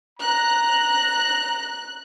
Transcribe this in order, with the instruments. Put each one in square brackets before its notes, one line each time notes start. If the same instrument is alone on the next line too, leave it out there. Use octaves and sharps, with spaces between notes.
[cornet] A#5 [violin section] F#6